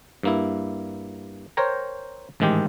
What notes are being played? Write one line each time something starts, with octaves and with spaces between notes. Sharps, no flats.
G2 A#3 E4
A#4 C5 C#5 G5 A#5
A1 G#2 D#3 G#3 G4